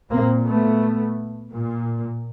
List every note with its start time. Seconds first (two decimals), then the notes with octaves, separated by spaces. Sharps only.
0.11 A#2 A#3 C4
0.46 A3 B3
1.53 A#2